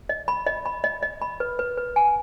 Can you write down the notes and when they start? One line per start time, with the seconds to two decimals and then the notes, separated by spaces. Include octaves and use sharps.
0.09 D#5
0.28 B5
0.47 D#5
0.66 B5
0.84 D#5
1.03 D#5
1.22 B5
1.40 B4
1.59 B4
1.77 B4
1.96 G#5